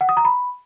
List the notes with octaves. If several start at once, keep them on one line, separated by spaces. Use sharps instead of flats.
F#5
D#6
A#5
B5